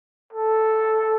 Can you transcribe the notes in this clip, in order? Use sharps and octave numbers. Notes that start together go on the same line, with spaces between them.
A4